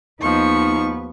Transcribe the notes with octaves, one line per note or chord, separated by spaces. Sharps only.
D#2 F3 B3 D#4 C#6